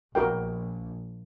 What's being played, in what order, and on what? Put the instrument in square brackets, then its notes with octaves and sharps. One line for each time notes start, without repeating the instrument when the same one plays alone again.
[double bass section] A#1 [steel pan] F#4 A#4 G5